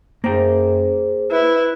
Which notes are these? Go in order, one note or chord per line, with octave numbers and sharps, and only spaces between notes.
F#2 A#3 G#4 C5 G5
E4 B4